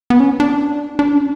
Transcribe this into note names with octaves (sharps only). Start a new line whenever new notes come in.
B3
C#4
D4
D4
C#4